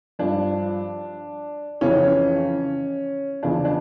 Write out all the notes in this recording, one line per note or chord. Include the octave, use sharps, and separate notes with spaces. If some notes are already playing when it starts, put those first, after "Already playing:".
G2 F3 D4
F2 C#3 E3 C#4
E2 C#3 F3 D4
D4